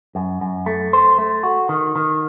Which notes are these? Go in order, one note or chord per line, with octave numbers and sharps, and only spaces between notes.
F#2
F#2
A3
C5
A3
F#4
D#3
D#3